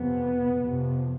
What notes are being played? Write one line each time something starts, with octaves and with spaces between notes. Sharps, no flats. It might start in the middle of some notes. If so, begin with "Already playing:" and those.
Already playing: F2 C3 B3
F2 C3